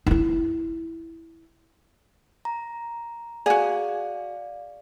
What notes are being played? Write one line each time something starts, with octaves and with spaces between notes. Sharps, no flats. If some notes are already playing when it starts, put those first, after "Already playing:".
D#4 E4
A#5
F#4 G#4 D5 F5